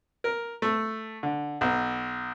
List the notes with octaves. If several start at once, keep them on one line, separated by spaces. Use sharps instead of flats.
A#4
A3
D3
B1